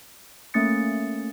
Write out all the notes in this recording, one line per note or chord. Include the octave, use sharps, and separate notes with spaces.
A3 A#3 C#4 D#6 A6 C#7